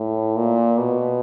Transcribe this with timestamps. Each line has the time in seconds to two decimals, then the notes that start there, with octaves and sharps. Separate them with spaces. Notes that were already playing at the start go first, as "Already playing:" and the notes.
Already playing: A2
0.36 A#2
0.78 B2